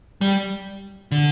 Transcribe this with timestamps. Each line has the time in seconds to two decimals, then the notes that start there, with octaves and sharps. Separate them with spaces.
0.21 G3
1.12 D3